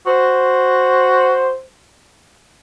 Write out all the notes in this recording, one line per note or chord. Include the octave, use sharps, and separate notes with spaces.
F#4 C5